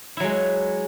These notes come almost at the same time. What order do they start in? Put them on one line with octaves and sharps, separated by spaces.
E4 F#3 G#3